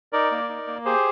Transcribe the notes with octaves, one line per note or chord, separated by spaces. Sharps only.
D#4 A#4 D5
A#3
D#4
A#3
G4 G#4 C5